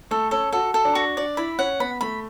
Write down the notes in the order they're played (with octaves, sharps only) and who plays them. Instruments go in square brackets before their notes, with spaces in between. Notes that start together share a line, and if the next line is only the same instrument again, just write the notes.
[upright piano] A3 [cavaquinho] A4
[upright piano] C#4 [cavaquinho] A4
[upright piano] F#4 [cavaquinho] A4
[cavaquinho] A4
[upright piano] D4
[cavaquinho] F#4
[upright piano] D4 [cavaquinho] D5
[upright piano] E4 [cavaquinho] B5
[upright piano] C#4 [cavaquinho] F#5
[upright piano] B3 [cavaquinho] B5
[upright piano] A3 [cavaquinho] B5